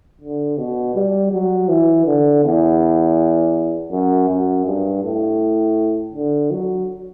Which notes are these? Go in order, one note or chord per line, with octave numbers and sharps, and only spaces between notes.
D3
B2
G3
F#3
E3
D3
E2
F#2
F#2
G2
A2
D3
F#3